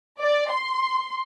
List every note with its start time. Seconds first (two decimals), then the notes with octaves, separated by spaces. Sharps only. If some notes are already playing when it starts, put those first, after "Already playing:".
0.19 D5
0.50 C6